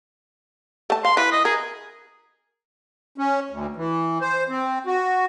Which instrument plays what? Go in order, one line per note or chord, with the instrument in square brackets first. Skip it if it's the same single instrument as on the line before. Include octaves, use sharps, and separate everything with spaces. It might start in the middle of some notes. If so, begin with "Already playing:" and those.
[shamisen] A3 A5
[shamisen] F5 [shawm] C6
[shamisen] E3 [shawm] B4
[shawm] D#5
[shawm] G#4 [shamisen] A#4
[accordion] C#4
D2
E3
C5
C4
F#4